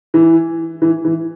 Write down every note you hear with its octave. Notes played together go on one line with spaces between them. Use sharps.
E3
E3
E3